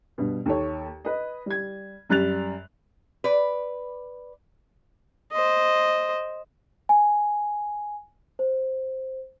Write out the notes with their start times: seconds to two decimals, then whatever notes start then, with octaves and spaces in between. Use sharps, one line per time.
0.18 G2 B2
0.46 D#2 A4 C#5
1.05 B4 D#5
1.46 G3 G#6
2.10 F#2 G3 F#6 A6 F7
3.24 B4 D5
5.32 C5 D#5
6.89 G#5
8.39 C5